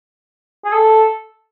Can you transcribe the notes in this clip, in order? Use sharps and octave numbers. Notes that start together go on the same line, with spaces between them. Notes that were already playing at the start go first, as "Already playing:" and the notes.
G#4
A4